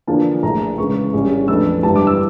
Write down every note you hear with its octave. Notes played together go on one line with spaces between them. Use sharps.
E2 D3 F3 A#3 D4 A5
A#1 A#2 A3 E4 A#5
C#2 C#3 E3 C#6
A#1 A2 G3 C#4
F2 E3 A3 D4 E6
G1 G2 E3 G3 A5
D6
E6